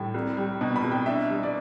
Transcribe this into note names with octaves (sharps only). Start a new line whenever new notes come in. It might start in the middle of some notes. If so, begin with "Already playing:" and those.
Already playing: A2 G3
C2
G3
B2
B5
C2
G5
D4 E5
G3
D5